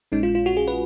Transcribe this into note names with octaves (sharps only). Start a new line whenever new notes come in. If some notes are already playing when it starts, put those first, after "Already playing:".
A#1 A#2 G#3 C#4 D#4
F4
F4
F#4
G#4
B4